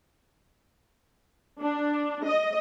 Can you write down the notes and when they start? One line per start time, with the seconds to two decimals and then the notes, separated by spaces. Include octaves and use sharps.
1.60 D4
2.25 D#5